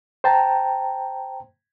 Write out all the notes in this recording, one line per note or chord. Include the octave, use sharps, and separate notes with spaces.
C5 G5 A5 A#5